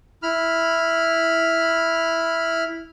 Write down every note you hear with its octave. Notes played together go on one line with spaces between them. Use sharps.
E4 B5 F6